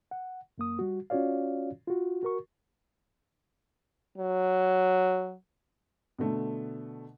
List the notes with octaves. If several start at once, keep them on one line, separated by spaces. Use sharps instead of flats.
F#5
F#2 A#3 D#6
G3 F#4
C#4 F4 F#4 C#5 D5 F5
F4 F#4
F#4 A#4 C#6
F#3
B2 D3 A3